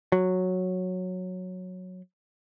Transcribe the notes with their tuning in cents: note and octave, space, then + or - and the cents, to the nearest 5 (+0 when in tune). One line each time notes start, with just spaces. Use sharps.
F#3 -10